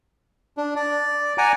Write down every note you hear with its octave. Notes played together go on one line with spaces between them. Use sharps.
D4
D5
D5 F#5 G#5 A#5 D6